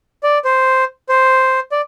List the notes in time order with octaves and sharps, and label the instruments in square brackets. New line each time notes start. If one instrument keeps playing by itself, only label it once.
[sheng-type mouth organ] D5
C5
C5
D5